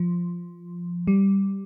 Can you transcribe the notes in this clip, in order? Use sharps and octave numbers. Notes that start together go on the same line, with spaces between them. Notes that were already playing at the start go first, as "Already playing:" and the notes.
Already playing: F3
G3